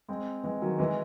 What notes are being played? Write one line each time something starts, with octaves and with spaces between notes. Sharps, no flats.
G#3 C4
E3 G#3
D#3 F#3
E3 G#3